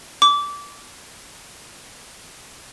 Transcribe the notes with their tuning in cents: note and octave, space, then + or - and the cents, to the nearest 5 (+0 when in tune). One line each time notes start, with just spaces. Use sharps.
D6 -20